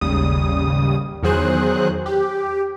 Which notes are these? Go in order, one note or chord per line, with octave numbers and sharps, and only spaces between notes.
G#1 D#2 C#3 G3 D#6
E2 D#3 F#3 G#4 C5 F#6
G4